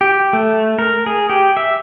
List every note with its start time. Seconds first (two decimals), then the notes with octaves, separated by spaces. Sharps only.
0.01 G4
0.33 A3
0.79 A#4
1.06 G#4
1.29 G4
1.57 E5